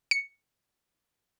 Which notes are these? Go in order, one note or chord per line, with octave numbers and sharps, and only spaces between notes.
C#7